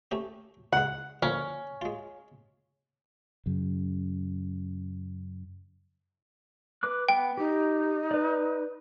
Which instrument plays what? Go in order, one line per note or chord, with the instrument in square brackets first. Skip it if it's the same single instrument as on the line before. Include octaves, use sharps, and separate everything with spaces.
[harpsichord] A3 C#4 G4
[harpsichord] C#2 G#3 [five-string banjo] F#5
[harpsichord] D3 F3 A#3 [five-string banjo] C#4
[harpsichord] G#3 F4
[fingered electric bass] F#2 C#3
[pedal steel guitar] B4 D6 F#6
[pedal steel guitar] B3 [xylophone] G5
[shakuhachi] D#4 [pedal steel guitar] G4
[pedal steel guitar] B4 D5